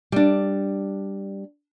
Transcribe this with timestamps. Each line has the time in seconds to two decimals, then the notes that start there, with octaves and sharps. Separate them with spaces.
0.12 G3 D4